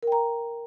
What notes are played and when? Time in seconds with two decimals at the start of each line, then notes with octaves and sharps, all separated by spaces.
0.03 A#4
0.07 G5
0.12 A#5